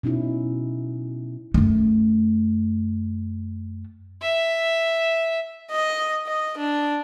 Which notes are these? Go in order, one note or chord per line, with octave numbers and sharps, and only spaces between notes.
B2 C#4 D#4 E4
F#2 A3
E5
D#5
D#5
D4